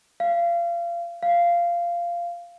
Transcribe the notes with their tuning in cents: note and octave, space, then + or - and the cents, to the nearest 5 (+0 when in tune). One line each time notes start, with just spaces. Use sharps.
F5 -30
F5 -15